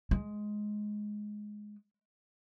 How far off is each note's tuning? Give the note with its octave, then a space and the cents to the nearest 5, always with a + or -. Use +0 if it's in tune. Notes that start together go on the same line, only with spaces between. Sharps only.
G#3 +10